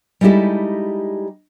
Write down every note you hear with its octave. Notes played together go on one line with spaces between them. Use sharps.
G3 G#3 D#4 E4 G4 A4